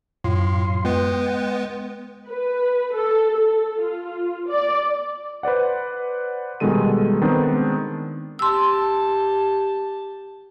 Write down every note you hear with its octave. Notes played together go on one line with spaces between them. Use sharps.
F#2 A2 F4 C6
G#3 B3 B4 G5
B4
A4
A4
F4
D5
B4 C5 D5 F#5
B2 D#3 G3 G#3 A4 D#7
D#3 G#3 B3 C4 D4
G4 A5 C6 E6